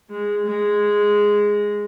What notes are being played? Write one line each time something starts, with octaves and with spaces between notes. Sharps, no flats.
G#3
G#3